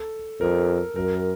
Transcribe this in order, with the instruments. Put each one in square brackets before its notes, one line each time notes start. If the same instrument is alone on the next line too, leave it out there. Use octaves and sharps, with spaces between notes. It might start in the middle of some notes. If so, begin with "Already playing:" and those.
Already playing: [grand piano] A4
[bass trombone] F2 [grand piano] A#4
[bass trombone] F#2 [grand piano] A#4